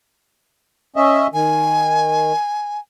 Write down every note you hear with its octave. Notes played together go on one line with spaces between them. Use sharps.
C#4 D#5 E5
D#3 G#5